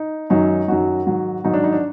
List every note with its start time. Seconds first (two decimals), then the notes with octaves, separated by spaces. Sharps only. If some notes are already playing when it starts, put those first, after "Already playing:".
Already playing: D#4
0.30 F#2 D#3 F#3 D#4
0.68 F#2 D#3 F#3 F#4
1.06 G#2 D#3 F#3
1.44 G#2 D#3 F#3 D#4
1.54 D4
1.64 D#4
1.73 D4